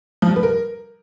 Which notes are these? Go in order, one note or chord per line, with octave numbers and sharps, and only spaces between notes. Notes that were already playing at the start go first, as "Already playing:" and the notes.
F3
G3
B4
A#4